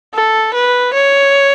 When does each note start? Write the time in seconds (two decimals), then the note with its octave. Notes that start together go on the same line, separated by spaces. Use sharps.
0.14 A4
0.54 B4
0.94 C#5